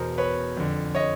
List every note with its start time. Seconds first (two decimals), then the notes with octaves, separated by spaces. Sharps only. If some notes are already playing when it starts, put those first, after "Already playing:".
Already playing: E2 B2 A#4 C5
0.18 B4 C#5
0.57 F2 D3
0.95 C#5 D#5